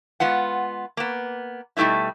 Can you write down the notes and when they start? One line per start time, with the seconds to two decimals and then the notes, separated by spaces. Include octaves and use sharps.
0.20 G#3 B3 F4 F#5
0.97 A#3 B3
1.77 B2 G3 A3 D#4 E4